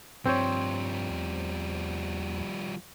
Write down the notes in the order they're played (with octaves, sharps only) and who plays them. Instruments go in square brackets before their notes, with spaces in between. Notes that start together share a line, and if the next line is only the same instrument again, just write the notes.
[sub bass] G2 [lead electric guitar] F3 G3 [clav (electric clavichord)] C4 C5 C#5
[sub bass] E2